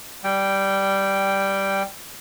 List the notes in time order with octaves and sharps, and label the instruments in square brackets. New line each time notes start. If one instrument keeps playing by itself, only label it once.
[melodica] G3 G5